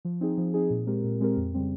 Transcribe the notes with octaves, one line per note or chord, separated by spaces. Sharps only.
F3
C4 D#4 G#4
F3
C4 D#4 G#4
A#2
G#3 C4 G4 A#4
A#2
G#3 C4 G4 A#4
F2
C#3 G3 C4